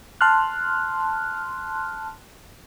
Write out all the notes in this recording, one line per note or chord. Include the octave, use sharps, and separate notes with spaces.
A5 C6 F6 F#6